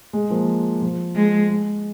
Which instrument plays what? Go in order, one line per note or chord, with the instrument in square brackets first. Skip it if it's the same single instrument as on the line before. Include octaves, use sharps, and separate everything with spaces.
[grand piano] G#3
F3 A#3
F3
[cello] G#3
[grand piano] G#3